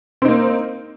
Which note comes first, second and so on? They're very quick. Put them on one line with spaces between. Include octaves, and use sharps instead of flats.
C4 D#4 A#3